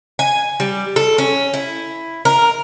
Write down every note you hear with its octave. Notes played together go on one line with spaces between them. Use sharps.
G#5
G3
A4
C#4
E4
A#4